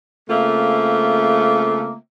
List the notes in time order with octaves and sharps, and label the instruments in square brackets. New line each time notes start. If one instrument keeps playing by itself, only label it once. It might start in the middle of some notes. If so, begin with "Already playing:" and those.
[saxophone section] C#3 A3 A#3 C4 F4 E5